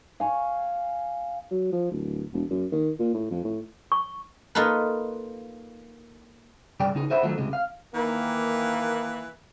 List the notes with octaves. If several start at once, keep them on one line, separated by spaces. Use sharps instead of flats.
F5 G#5 C#6
F#3
F3
D1
E1
F#2
D#3
A#2
A2
F2
A2
C#6
A#3 D#4 F4 A4 B4
C2 G2 G#4 D5 G5
C#3 D#4 G#4
G#4 C5 E5 F#5 A5 B5
D#3 F3 F#3 A3 D#4 A4
C#2 C3 G#3
F5
D#3 E3 A#3 A#4